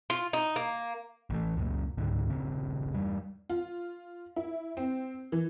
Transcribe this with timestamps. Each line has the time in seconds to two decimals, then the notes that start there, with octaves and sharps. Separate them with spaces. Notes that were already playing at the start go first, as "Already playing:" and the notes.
0.10 F4
0.33 D#4
0.56 A#3
1.30 A1 E3 A3
1.57 C#2 F#2 A#2
1.97 C#2 G#2 D3
2.30 D#1 C#3 C4
2.94 E2 G2 G3
3.50 F4
4.36 E4
4.77 C4
5.32 E3